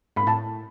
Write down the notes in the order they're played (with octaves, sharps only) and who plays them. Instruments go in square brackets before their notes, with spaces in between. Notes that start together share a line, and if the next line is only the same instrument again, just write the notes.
[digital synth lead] G#2 [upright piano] B5
[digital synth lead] A2 [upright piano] A5